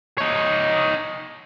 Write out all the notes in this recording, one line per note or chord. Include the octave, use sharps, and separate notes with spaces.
D#4 C#5